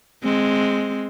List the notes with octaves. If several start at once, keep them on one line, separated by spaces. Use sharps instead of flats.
G#3 C4